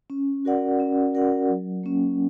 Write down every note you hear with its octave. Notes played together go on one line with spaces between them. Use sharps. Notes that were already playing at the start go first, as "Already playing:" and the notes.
C#4
F#4 A#4 D5 F#5
C#4
F#4 A#4 D5 F#5
F#3
A#3 C#4